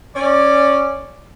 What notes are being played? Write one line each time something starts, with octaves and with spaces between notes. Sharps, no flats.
C#4 D5